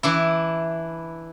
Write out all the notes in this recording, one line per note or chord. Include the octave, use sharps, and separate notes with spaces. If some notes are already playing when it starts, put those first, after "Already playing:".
E3 D4 E4